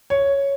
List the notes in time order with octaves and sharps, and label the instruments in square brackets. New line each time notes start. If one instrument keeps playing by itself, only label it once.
[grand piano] C#5